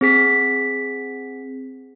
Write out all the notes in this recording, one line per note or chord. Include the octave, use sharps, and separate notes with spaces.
C4 G#4 B6